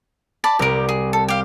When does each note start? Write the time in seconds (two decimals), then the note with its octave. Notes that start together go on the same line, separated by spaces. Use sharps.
0.44 D5 A5 B5
0.59 C2 C3 G4 A#4 D7
0.89 G#4
1.13 A4
1.28 G4 F5